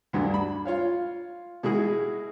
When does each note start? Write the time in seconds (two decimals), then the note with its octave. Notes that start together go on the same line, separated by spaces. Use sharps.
0.13 D2 G2 D3
0.34 B5
0.65 F4 C#5 F5
1.63 B2 G#3 E4 F#4 G#4